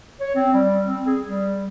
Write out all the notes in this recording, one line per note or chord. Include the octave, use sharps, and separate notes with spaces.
C#5
C4
G3
C4
G#4
G3